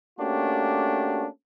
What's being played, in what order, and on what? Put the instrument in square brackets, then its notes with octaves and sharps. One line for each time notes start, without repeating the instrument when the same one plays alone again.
[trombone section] A3 A#3 C#4 D4 F#4 G4